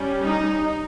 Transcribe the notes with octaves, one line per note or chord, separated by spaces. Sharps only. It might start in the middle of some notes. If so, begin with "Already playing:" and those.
Already playing: G3 C#4
D#4